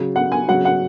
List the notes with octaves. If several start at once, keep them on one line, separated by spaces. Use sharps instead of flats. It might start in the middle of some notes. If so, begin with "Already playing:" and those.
Already playing: C#3 F#3
F#5
G#5
C#3 F#3 F#5
F#5